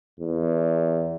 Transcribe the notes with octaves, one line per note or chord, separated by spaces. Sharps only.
E2